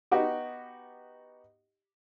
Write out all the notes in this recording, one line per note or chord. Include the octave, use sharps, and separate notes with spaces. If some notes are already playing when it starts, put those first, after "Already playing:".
B3 D#4 F#4 G4